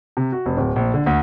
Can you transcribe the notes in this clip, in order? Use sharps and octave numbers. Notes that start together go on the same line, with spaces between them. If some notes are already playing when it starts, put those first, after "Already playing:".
C3
F#4
F1
D1
A#1
D3
D2